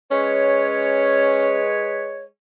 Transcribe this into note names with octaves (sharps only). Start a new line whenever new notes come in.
G#3 C#4 B4 C#5